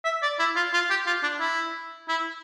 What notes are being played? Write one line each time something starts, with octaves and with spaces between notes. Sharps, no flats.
E5
D5
E4
F4
F4
G4
F4
D4
E4
E4